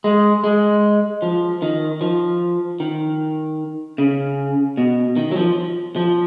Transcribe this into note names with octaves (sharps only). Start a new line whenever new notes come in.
G#3
G#3
F3
D#3
F3
D#3
C#3
B2
D#3
F#3
F3
F3